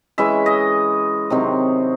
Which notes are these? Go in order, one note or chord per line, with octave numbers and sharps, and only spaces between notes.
E3 G#3 C#4 E5
D#5
C3 D#3 F#3 C4